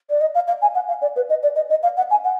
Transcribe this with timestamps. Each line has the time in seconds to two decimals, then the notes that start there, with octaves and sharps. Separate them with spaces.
0.10 D5
0.21 D#5
0.35 F5
0.47 F5
0.61 G#5
0.75 F#5
0.88 F5
1.02 D5
1.16 B4
1.29 D#5
1.43 D5
1.56 D#5
1.70 D#5
1.83 F5
1.97 F#5
2.10 G#5
2.24 F#5